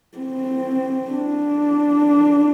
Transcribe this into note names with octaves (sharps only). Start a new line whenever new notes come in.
C4
D4